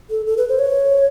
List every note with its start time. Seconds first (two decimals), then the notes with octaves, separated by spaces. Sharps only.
0.10 A4
0.27 A4
0.37 B4
0.49 C5
0.59 C#5